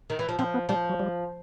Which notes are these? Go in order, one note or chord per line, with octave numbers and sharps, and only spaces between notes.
D#3
E3
F3
F3 C4
B3
F3 G3
F#3
G3